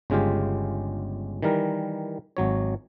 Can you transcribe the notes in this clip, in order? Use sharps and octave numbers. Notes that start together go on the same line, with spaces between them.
G1 C#3 G#3 F4 G4
D#3 E3 G3 A#4
G#1 F#3 C#5